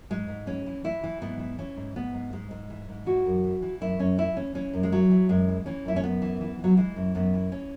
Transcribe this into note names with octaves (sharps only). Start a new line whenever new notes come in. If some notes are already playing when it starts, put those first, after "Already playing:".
G#2 G#3
G#2
E3 C#4
E3
E3 E4
E3
G#2 B3
E3
E3 C#4
G#2
G#2 B3
G#2
G#2 G#3
G#2
E3
G#2
E3 F#4
F#2
E3
E3
F#2 E4
F#2 C#4
E3 E4
E3 C#4
E3 C#4
F#2
G#3
E3 F#3
E3
F#2 G#3
E3
E3 C#4
F#2 E4
C#4
F#2 B3
E3
E3
E3
F#3
E3 G#3
F#2
F#2 B3
E3
C#4